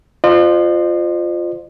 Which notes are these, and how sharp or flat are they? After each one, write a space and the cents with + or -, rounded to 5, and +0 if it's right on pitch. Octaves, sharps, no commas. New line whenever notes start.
F4 +0 C5 +0 D#5 -45